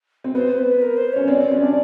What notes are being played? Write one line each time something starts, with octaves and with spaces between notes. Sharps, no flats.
C4
B3 C5
B4
A#4
C5
C#4 C#5
C4 D5
C4
C#4
D4